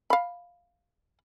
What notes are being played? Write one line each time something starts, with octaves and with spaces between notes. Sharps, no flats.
F5 B5